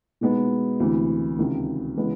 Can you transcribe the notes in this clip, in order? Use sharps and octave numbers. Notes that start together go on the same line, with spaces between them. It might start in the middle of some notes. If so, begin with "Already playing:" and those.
B2 G#3 B3 D#4
D2 C3 E3
C#2 C3 D#3
C#3 E3 G#3 B3